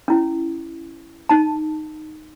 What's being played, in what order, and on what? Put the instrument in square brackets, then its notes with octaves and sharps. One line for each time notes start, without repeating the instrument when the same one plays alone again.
[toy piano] C#4 E4
D#4 A5